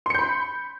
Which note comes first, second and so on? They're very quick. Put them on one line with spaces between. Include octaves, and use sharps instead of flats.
C6 C#7 G6 B5